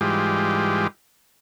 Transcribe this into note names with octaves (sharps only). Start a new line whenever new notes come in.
G#2 E3 G3 G#3 F4 G4